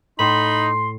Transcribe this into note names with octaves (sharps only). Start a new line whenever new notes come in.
A2 D#4 B5 C6 E7